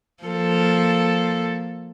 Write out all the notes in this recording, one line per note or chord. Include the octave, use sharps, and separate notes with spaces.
F3 A#3 A4